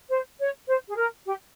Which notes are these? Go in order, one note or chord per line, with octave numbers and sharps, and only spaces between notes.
C5
C#5
C5
G#4
A#4
G4